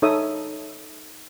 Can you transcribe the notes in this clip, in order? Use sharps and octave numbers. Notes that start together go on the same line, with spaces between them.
D#4 A4 C#5 E5 D#6